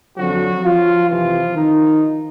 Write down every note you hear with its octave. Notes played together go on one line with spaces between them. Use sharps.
F2 D3 F3 F#3 F#4
F3 F4
F2 C3 E3 F3 F4
D#3 D#4